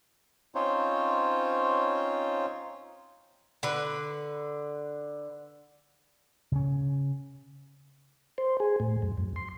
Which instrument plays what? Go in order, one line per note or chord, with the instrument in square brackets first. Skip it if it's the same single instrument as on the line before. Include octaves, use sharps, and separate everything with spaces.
[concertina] C4 C#4 D#4 F4 C5 C#5
[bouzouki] D3 B4
[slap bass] C#3 C#4
[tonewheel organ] C5
G#4
A2
F#2
F#2
C6